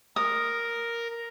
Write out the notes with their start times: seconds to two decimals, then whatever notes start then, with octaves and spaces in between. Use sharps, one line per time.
0.16 A#4 D#6